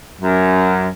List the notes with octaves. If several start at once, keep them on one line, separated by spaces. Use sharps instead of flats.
F#2